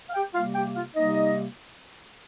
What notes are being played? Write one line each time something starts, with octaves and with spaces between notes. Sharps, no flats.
F5
G4 G5
C3 G3 A#3 F4 F5
G4 G5
F4 F5
C3 G3 A#3 D#4 D#5